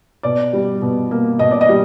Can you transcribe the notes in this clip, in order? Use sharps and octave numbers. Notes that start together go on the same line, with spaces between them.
B2 D5
G3
B2
A#3
B2 D#5
D5
D#5
G3